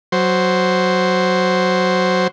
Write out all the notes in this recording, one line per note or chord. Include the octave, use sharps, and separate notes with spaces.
F#3 C5